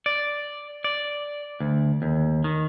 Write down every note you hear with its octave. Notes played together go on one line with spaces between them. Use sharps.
D5
D5
D2
D#2
D#3